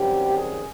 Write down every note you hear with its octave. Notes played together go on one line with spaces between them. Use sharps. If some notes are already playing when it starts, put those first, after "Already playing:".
Already playing: F#2 D#3 G3 C4 G4
G#4